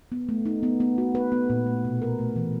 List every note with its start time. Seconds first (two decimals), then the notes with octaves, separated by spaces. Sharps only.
0.12 B3
0.29 A3
0.46 D#4
0.63 B3
0.80 B3
0.98 F#4
1.15 B4
1.32 B3
1.50 A#2
1.66 A3
1.85 B2
2.02 A#4
2.19 A3
2.36 E3